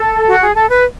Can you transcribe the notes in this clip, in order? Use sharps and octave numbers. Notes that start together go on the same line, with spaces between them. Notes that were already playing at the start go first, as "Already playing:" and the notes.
Already playing: A4
F#4
G#4
A4
B4